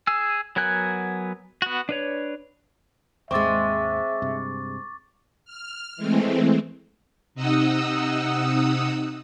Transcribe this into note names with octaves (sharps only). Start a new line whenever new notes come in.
G#4 G#5 E6
F#3 B3 A#4 G#5 F#6
B3 F#4
D4 B4 C#5
G#1 D#2 G#3 C4 E5 C#6 D6 A6
G2 C3
F6
E3 G#3 A3 C4
C3 D#4 D#5 F#5 D#6 E6